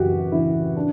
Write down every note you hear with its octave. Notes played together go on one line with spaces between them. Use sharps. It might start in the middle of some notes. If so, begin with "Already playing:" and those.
Already playing: F#2 C#3 E3 F#4 G4
C#3 E3 E4
D4